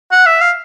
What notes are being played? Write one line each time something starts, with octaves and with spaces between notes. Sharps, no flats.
F#5
E5
F5